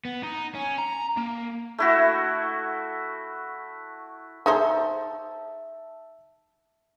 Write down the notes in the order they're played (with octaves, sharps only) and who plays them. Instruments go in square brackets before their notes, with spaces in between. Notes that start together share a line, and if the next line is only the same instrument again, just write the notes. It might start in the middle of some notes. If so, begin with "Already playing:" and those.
[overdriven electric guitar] B3
D#4
C#4
A#5
A#3
[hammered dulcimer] A3 E4 F#4
[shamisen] D#4 G#4 C5 [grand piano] E5 A5